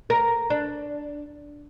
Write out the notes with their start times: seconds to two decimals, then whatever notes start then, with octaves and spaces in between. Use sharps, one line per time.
0.10 A#4
0.50 D4